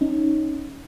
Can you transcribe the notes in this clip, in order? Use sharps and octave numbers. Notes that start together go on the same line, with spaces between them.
C#4 D#4